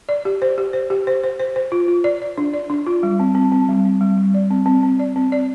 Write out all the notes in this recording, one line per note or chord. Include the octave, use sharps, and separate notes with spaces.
D5
G4
C5
G4
C5
G4
C5
C5
C5
C5
F4
F4
D5
D5
D4
D5
D4
F4
G3
C4
C4
C4
G3
C4
G3
G3
D5
C4
C4
C4
D5
C4
D5